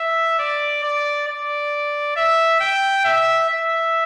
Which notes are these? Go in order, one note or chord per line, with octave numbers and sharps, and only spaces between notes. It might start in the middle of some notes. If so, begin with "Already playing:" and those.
Already playing: E5
D5
D5
D5
E5
G5
E5
E5